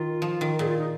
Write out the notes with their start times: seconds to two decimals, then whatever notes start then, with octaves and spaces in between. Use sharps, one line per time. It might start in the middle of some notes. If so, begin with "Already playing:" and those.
Already playing: D#3 F4
0.22 F3
0.41 D#3
0.59 A#2 G#4
0.68 F4
0.77 D#4